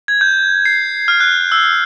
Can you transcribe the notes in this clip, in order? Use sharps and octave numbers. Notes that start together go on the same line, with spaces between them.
G#6
G6
C7
F6
F#6
E6